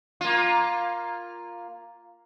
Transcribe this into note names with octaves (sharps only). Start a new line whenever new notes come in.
A#3 F4